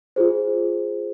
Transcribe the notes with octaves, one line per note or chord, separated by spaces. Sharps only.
F4 G#4 C5